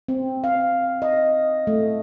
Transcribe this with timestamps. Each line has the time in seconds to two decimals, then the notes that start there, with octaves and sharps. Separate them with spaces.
0.08 C4
0.44 F5
1.02 D#5
1.67 A3